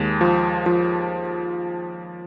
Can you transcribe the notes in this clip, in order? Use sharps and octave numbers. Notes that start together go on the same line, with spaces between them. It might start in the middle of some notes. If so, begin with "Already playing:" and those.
Already playing: D#2 G#3
F3
F3